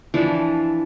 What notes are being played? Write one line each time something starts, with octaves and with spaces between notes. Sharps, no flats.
E3 F3 D4